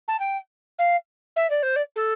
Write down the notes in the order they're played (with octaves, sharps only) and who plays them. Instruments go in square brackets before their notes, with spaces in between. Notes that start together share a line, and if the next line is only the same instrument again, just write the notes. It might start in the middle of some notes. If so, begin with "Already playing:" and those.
[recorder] A5
G5
F5
E5
D5
C5
D5
A4